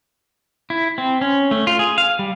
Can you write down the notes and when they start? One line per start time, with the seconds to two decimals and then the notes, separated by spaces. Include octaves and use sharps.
0.70 E4
0.98 C4
1.21 C#4
1.51 A3
1.67 F4
1.79 G#4
1.98 F5
2.19 G3